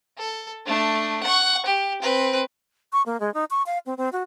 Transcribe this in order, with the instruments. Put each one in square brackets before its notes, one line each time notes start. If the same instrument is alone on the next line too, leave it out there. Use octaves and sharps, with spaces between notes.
[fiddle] A4
A3 D4
F#5 C#6
G4
C4 B4
[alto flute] C#6
A#3
G#3
D#4
C#6
F5
C4
C4
F#4